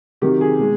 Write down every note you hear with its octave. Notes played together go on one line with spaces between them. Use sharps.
C3 D#3 F#3 G4
G#4
B2 G#3